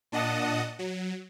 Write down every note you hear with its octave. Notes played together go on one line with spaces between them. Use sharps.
A#2 D4 D#5 F#5 A5 D#6
F#3